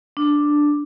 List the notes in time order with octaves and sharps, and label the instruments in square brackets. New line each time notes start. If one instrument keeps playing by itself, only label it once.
[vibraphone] D4